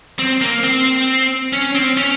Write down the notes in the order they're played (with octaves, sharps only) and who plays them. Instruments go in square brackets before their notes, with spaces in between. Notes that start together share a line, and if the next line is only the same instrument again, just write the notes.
[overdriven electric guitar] C4
A#3
C4
C#4
C4
C#4